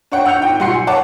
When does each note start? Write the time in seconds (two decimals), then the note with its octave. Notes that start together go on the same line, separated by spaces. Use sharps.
0.12 D4 C#5 F#5 G5
0.25 F#5 E6 G6 C#7 F7
0.40 G#1 G5
0.60 B1 G3 F#5 C6 C7 C#7
0.74 G#5
0.87 C#5 F#5 A5 D6